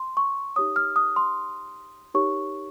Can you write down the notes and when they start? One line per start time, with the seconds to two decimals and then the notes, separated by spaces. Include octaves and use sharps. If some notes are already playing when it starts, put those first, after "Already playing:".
Already playing: C6
0.17 C#6
0.56 D#4 G4 C#5 D#6
0.76 F6
0.96 D#6
1.16 C6
2.14 D#4 G4 A#4 C#5 C#6